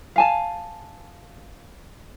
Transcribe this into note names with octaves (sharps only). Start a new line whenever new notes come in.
F5 G#5 A5